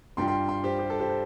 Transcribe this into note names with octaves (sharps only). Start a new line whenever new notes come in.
G2 G3 F4 G5 C6
G5 C6
G5 C6
G4 C5
G4
A4
G4 C5
C5